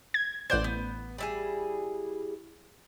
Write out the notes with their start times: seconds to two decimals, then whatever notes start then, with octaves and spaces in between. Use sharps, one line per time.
0.14 G#6
0.50 A1 C5 D5 F#5 G6
0.64 B3
1.18 G3 E4 G#4